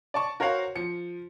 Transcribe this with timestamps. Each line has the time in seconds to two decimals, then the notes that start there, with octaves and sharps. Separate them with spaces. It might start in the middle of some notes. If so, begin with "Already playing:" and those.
0.14 D5 A5 C#6
0.40 F#4 A#4 C5 C#5 F5 F#5
0.76 F3 C#7